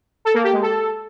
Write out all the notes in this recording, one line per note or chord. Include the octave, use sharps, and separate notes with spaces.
A4
A#3
G4
G#3
A4